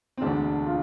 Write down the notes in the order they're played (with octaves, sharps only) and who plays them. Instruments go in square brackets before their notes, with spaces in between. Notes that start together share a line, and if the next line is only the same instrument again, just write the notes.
[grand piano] C4
E1 D2 D3 D4
F4